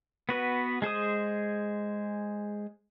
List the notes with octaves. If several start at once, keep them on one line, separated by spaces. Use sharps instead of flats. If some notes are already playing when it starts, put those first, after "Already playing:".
B3 F#4 B4
G#3 G#4 C5 D#6